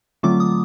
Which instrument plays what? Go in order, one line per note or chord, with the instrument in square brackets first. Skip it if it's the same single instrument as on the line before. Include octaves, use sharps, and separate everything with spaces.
[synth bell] D3 F#3 A3 C4 F4 D6
D#6